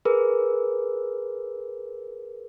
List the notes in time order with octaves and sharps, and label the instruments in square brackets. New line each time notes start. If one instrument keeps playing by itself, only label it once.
[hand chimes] G#4 A#4 B4